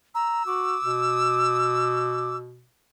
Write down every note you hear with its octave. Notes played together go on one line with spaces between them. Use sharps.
A#5 E6
F#4 D6
B2